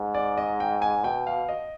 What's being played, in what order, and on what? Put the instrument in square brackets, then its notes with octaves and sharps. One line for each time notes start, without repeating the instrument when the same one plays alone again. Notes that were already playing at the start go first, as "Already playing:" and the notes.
Already playing: [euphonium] G#2
[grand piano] D5
D#5
G5
G#5
[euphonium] B2 [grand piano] G5
[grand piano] F5
D#5